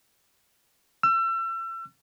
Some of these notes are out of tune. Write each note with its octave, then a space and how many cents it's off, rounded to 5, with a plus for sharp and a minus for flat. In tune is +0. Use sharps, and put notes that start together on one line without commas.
E6 +35